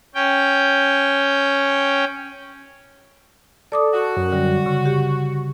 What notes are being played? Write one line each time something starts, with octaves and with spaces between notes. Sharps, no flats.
C#4 G5
A4 D5 D6 D#6
F#4
F#2
D3 G3
C#3 C#6
G4